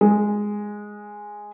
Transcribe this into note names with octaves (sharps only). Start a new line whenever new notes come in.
G#3